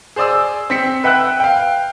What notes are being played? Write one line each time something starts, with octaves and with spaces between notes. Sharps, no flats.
G#4 C5 D5 D#6 E6
C4 B6 C#7
B4 E5 F#5 G5 E6 F#6
F5 G5